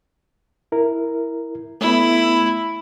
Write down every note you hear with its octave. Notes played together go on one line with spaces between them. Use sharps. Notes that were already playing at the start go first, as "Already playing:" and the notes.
E4 A#4
A3 B3 E4